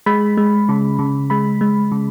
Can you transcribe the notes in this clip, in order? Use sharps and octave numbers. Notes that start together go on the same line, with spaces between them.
G#3 B5
G#3
C#3
C#3
G#3 B5
G#3
C#3